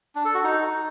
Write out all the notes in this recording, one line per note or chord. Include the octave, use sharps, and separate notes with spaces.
D4
A4
F#4
D#4